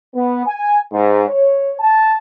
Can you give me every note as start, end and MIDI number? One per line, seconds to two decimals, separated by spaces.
0.15 0.43 59
0.46 0.79 80
0.92 1.23 44
1.28 1.74 73
1.79 2.17 81